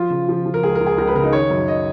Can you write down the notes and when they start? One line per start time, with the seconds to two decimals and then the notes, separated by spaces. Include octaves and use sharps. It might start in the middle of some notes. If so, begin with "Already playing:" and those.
Already playing: F3 F4
0.10 C#3
0.29 F3
0.46 F3
0.54 A#4
0.63 C#2 G#4
0.75 A#4
0.81 C#2
0.86 G#4
0.98 C#2 A#4
1.07 B4
1.15 C#3 A#4
1.24 D#4
1.32 D#3 C#5
1.50 F#2
1.68 D#5